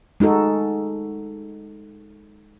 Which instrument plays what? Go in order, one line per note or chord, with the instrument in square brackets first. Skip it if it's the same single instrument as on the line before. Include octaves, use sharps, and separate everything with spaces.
[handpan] G#3 D#4 F#4 A4